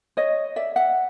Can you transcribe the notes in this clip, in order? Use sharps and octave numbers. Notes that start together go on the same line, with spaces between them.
C#5 D#5
D5 E5
E5 F#5